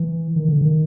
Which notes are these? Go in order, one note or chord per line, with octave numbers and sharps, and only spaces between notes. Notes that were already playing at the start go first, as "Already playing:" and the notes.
Already playing: E3
D#3
D3
D#3